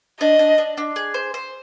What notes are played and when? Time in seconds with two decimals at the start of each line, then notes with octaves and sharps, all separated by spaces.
0.20 D4 D#5
0.39 D4
0.58 D4
0.77 D4
0.96 G#4
1.14 C5
1.34 C5